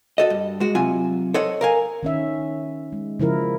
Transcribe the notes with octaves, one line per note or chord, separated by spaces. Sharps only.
F#4 A4 D#5
G2
G#3 F#4
C3 F#3 F4 G#5
A4 C5 C#5 D#5 F#5
A#4 F5 G#5
D#3 C#4 E5
G#3
C#3 F3 E4 A#4